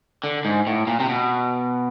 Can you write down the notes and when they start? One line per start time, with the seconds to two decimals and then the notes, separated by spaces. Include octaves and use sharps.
0.24 D3
0.45 G#2
0.67 A2
0.87 A#2
1.00 C3
1.09 B2